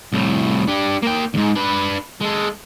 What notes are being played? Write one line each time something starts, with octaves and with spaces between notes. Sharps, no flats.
C2 A2
D4 G4
A#3 G5
D2 G#2
D4 B4
G#3 A4